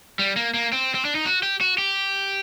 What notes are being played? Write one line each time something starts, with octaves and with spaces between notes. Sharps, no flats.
G3
A#3
A#3
C4
C4
D4
D#4
F#4
G4
F#4
G4